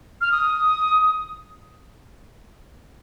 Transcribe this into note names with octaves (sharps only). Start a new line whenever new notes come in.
F6
D#6